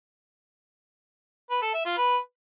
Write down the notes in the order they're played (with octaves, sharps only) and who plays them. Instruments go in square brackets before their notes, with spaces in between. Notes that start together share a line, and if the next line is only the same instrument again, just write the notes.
[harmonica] B4
A4
E5
F4
B4